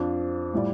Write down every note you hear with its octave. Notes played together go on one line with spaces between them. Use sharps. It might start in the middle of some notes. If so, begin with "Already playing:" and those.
Already playing: F2 F3 D4
A2 G3 F4 D5